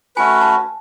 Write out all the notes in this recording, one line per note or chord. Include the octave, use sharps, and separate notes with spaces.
A3 C#4 F#4 B4 G#5
A5